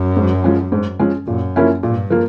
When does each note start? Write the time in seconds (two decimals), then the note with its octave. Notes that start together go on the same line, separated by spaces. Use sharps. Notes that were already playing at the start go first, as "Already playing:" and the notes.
Already playing: F#2
0.17 G#2
0.44 F3 G#3 C#4
0.72 G#2
0.99 F3 G#3 C#4
1.27 F#2 A#2
1.56 F3 A#3 C#4 E4
1.83 G2 A#2
2.10 F3 A#3